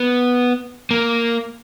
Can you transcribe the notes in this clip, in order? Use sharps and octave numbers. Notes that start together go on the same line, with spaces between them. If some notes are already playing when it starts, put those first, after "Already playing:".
Already playing: B3
A#3